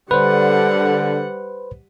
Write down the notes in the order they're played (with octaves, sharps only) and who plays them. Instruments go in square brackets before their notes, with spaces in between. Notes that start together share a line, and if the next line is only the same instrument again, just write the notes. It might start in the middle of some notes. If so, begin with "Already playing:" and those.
[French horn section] D3 [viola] G3 F#5 [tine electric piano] B4 C5